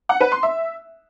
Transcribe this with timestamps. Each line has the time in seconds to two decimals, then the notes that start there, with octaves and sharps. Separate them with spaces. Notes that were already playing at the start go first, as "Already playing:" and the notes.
0.09 F#5
0.20 B4
0.32 C6
0.43 E5